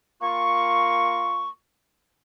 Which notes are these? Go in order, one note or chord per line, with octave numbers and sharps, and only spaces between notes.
A#3 F4 C#6